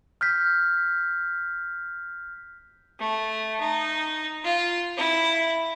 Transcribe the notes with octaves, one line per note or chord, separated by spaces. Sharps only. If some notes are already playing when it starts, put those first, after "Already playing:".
F6 G6 B6
A3
D#4
F4
E4